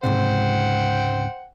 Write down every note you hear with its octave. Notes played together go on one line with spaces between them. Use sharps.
C#2 G#2 C3 C5 F#5 G5